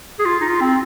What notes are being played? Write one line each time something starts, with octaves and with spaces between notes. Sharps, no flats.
G#4
F4
D#4
F4
C4